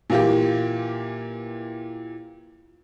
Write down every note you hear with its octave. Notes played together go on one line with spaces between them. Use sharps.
A#2 E3 A#3 F4 G4